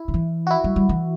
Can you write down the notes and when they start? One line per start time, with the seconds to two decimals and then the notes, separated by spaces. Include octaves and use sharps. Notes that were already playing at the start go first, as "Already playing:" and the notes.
Already playing: E4
0.08 D3
0.14 E3
0.47 F#4
0.51 E4
0.64 G3
0.76 G3
0.89 E3